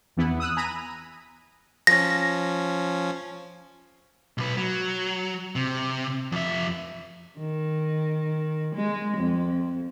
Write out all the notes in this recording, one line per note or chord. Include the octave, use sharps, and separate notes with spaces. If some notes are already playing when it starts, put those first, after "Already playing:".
E2 E3 B3 E4
D#6 E6 F#6
G#5 A#5 B5 D#7
F3 C#4 A#6
B1 B4
F#3
C3
F2 E5
D#3
G#3
F2